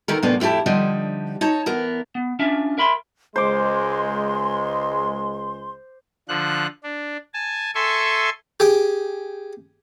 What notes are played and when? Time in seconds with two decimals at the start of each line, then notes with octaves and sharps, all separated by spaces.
0.08 D3 D#3 A#4
0.22 F#2 A2 C3 A#3 B3 D4
0.40 F2 A2 E4 G4 A5
0.66 D3 F3 G3 D4 D#4
1.41 D#4 C#5 A5 A#5
1.66 E2 B3 A#4
2.15 B3
2.39 C#4 D4 F4 E5
2.78 A#4 E5 B5 C6
3.36 C#2 G#3 C5 C6 D6
6.28 D3 F3 F#6
6.83 D4
7.34 G#5 A5
7.75 A4 E5 G#5 C6 C#6
8.60 G4 G#4 G5